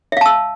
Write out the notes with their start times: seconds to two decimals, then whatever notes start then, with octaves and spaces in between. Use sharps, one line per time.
0.12 E5
0.17 F5
0.21 A5
0.26 E6